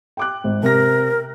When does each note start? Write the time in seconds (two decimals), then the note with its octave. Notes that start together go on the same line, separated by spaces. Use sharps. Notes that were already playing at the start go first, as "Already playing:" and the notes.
0.17 G5 D6 F#6
0.44 G#1
0.63 C3 A#4 A#6